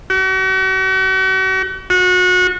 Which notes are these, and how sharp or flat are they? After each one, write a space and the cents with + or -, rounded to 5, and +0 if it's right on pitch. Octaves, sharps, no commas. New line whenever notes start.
F#4 +40
F#4 -30